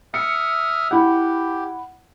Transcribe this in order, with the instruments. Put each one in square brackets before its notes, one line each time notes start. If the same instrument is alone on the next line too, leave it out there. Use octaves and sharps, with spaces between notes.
[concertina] E5 D#6 F6 [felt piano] C#7
[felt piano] E4 F#5 [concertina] G4